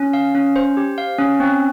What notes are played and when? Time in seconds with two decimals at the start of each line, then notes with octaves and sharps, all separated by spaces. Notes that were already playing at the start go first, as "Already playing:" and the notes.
Already playing: C#4
0.13 F5
0.35 C#4
0.56 C5
0.77 G4
0.98 F5
1.18 C#4
1.40 C4